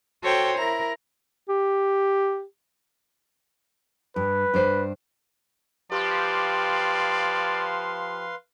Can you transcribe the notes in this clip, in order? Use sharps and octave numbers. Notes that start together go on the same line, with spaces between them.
F#4 A4 C5 C#5 G5
E4 A#4 A#5
G4
G2 B4
G2 D4 C5
F3 G4 B4 D5 F5 C6